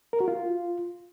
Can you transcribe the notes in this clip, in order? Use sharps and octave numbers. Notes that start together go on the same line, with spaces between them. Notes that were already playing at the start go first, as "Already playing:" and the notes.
A#4
F#4
F4